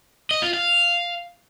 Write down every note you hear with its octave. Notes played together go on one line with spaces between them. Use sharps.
D#5
F4
F5